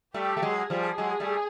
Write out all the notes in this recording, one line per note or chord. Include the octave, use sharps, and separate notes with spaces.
G3 A3 G4
A3
F#3 G#3
G#4
F3 G3
F#3 G#3
G3 A3